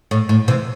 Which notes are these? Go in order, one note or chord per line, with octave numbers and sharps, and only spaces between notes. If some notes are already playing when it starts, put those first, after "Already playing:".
A2
A2
C3 E3